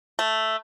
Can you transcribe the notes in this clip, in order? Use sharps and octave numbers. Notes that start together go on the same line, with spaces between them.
A3